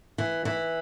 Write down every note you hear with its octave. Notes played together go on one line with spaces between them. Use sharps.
E3
E3